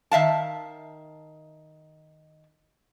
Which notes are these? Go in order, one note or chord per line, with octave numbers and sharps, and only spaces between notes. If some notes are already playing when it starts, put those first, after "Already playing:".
D#3 E5 F5 A5